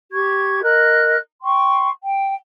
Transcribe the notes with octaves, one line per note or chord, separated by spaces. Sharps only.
G4 C#6 G#6
A#4 D#5 F#6
G5 C6 C#6
G5